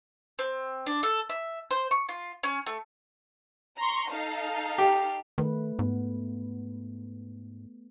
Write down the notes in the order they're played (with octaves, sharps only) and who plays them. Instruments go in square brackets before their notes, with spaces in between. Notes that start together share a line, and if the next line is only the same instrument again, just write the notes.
[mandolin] C4
D4
A4
E5
C5
C#6
F4
C#4
A3
[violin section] A#5 C6 C#6
D#4 A4 F5
[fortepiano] G4
[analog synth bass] D#3 [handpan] A3 B4
[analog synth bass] G#2 [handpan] B3